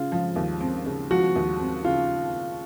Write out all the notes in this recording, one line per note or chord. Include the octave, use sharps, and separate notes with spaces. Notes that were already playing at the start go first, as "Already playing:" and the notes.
Already playing: C#3 F4
F3
D#2
C4
C#3
F3 F#4
D#2
C4
C#3 F4